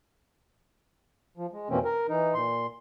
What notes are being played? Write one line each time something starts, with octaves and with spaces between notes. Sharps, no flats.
F3
G#3
F2 B2 E3 A#3 C4 C#4
A#4
E3 D#4
A#2 C6